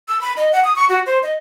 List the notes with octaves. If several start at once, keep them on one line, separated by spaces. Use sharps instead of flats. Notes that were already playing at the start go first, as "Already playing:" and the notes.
E6
B5
D#5
F#5
D#6
C#6
F#4
C5
D#5